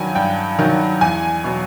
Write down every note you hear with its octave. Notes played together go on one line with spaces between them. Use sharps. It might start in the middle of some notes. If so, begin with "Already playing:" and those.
Already playing: G2 D#3 F#3 G5 G#5
G2 G5
D#3 F#3
E2 G#5
B2 F#3